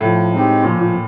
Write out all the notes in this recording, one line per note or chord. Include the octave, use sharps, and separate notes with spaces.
A2 F3
G#3 C4 D#4 G4
A#2 F3
A#2